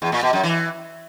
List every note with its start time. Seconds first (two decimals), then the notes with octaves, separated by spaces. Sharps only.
0.02 E2
0.12 A#2
0.23 B2
0.33 F#2
0.43 E3